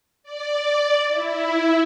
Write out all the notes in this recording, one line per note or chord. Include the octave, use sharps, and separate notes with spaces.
D5
E4